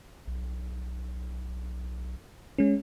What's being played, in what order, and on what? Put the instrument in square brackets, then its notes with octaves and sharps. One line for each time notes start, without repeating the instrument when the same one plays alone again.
[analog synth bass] B1
[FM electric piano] G#3 C#4